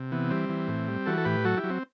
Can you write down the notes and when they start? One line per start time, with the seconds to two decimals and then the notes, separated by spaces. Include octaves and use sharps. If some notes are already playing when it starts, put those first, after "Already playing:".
Already playing: C3
0.12 E3 B3
0.31 G3 C4
0.49 E3
0.68 A2
0.88 G3
1.06 E3 F#4 A4
1.18 A4
1.25 A2 G4 B4
1.44 F#3 F#4 A4
1.57 E4 G4
1.64 F#3
1.70 C4